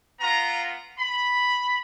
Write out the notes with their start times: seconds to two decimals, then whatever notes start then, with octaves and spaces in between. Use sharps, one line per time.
0.20 B3 F4 A#5
0.98 B5